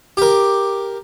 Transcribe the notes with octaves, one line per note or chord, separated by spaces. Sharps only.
G4 A#4